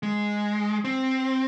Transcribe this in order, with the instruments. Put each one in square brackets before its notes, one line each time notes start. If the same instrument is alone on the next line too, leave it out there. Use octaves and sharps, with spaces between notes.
[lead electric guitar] G#3
C4